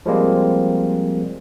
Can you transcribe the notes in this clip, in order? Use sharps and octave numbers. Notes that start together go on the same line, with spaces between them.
F3 G3 G#3 A#3 C4